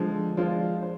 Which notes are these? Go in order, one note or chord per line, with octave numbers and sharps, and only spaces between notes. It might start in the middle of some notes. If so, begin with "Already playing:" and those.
Already playing: D3 F3 G#3
F3 G#3 D4 F4 C5
C5